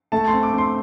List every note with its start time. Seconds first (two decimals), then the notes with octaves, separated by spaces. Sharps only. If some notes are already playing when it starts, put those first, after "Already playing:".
0.12 A3 A5
0.27 C6
0.33 C4
0.43 D6
0.53 C4 C6